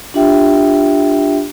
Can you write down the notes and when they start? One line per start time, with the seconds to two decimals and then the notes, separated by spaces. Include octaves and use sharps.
0.14 D4 F4 G4 E5 G5